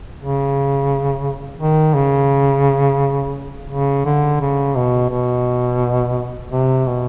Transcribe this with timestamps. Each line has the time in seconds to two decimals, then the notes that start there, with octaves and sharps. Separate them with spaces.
0.19 C#3
1.59 D#3
1.94 C#3
3.70 C#3
4.06 D3
4.41 C#3
4.75 B2
5.10 B2
6.52 C3
6.87 B2